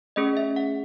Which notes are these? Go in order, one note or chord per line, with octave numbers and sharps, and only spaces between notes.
A3 C#4 G#4 D#5
E5
F#5